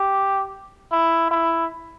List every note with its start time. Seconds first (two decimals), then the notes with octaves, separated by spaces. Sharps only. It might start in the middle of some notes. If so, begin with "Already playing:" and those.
Already playing: G4
0.93 E4
1.31 E4